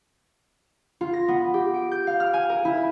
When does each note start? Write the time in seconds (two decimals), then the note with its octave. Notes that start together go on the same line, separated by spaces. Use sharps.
1.01 F4
1.13 A#6
1.28 B3
1.54 G4
1.74 D7
1.91 G6
2.07 F5
2.20 F6
2.34 G#5
2.49 A#4
2.65 E4